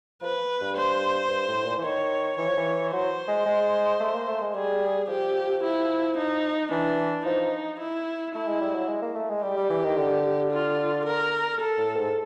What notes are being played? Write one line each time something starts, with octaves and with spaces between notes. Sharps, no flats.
F3 B4
G2
C5
G2
A2
A#2
E3
D#3 C#5
E3 C#5
F3
E3
F#3 C5
G#3
G#3
A3
A#3
A3
G#3
G3 G#4
F3 G4
E4
D#4
E3 D4
F3 D#4
E4
A3 E4
G#3
G3
F#3
G#3
A#3
A3
G#3
G3 G4
G3
E3
D#3
D3
F4
A#4
A4
A2
G#2